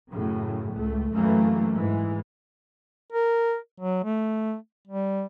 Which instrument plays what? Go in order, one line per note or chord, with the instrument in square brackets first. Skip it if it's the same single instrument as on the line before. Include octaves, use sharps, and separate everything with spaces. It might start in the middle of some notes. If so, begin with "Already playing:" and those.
[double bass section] F#2 A2 C#3
C#2 A3
F#2 E3 A3 A#3
G#2 E3 G#3
[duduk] A#4
F#3
A3
G3